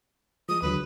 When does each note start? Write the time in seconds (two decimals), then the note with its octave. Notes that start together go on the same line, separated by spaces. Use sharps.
0.49 F3 G#3 D#6
0.62 D#2 D3 F#3 B4